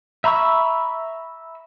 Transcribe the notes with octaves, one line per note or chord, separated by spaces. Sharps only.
E5 A#5 B5 C#6 E6